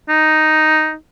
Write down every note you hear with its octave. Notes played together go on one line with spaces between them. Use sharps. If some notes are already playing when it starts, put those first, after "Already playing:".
D#4